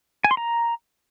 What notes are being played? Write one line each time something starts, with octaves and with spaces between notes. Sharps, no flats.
G#5
C6
A#5